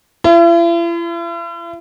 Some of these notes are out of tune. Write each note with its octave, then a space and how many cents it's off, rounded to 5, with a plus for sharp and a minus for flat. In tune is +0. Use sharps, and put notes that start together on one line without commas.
E4 +45